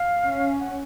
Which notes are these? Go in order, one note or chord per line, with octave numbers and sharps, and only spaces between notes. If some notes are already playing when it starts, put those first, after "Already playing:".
Already playing: F5
C#4
F#5